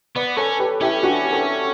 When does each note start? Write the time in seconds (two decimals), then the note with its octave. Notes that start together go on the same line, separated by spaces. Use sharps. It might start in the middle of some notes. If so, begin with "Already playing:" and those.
0.15 B3 B4 D5
0.37 C#4 A4 C#5
0.59 G4 B4
0.81 C#4 E4 G4
1.03 D4 F#4
1.32 A4 C#5